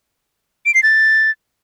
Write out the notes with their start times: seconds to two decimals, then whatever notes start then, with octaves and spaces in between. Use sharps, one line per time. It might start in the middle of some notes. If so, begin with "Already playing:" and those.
0.66 D7
0.74 C7
0.83 A6